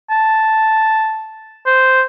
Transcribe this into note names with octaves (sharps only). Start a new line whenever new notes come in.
A5
C5